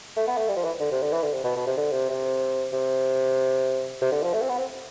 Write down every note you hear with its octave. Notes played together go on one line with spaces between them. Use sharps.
A3
B3
A3
G3
F3
E3
D3
C3
D3
E3
D3
C3
B2
B2
C3
D3
C3
C3
C3
C3
D3
F3
A3
C4
B3
C4